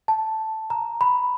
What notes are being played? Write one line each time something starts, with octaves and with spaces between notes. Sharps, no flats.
A5
A#5
B5